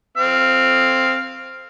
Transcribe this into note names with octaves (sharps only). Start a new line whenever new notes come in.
C4 F5